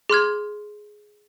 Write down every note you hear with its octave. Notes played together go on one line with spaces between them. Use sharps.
G#4 C6 F6 G#6